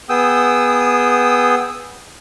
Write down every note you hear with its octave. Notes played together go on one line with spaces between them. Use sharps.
B3 G#4 G5 D#6 E6